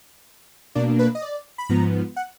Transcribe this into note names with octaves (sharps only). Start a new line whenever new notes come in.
B2 A#3 D4 D5
B4
D#5
D5
B5
G#2 F3 B3 A#5
F#5